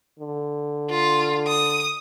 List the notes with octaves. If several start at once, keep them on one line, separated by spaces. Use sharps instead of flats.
D3
F4
D#6